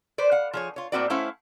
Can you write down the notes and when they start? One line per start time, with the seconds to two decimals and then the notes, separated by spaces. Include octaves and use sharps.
0.18 B4 C5 D5
0.32 F5 F#5
0.53 F3 G#4 C#5
0.76 F4 C#5
0.92 A2 A#3 C4 F#4 B4 D5
1.10 A3 C#4 E4 C5 F5 F#5